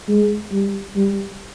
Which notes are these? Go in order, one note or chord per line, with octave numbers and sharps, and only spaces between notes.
G#3
G3
G3